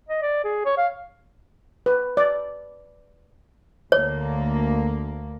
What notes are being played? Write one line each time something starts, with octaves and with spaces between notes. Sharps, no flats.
D#5
D5
G#4
C#5
F5
B4
D5
D2 A#3 C#5